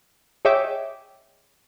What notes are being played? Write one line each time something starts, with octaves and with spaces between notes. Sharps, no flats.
G#4 C#5 D#5 E5 G5 D6